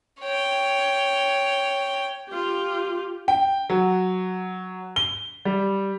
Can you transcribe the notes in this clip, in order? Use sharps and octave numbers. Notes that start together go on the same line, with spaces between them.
C#5 G5
F4 G4
G5
F#3
G7
G3